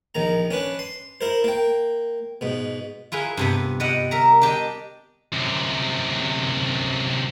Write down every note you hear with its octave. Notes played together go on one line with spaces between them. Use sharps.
A#1 D#3 A#5
C#4 D4 B4
C6
E4 A#4 C5
A#3 G5
G#2 B2
E4 F4 G#4 B4
G2 C3 B3
G3 E4 D#5 F#5
A#4 E5 A#5
D4 G4 D5 D#5
F#2 C3